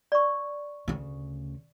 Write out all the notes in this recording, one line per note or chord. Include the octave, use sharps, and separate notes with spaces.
D5 C#6
D2 C#3